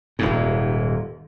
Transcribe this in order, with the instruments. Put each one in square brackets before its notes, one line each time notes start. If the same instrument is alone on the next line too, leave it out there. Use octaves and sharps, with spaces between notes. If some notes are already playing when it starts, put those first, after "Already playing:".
[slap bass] D#1 D#2 G#2